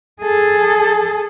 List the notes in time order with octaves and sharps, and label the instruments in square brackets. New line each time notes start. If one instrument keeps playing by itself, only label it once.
[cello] G#4 A4